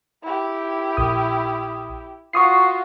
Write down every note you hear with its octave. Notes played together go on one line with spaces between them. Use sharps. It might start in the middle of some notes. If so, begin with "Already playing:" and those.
E4 G4
A#1 D#6
F4 F#4 C#6 D#6 C7